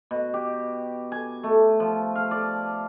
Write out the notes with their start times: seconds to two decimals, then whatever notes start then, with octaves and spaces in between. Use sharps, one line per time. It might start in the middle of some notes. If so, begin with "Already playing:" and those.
0.11 B2
0.34 G4
1.12 G#5
1.43 A3
1.80 F3
2.15 F5
2.31 D5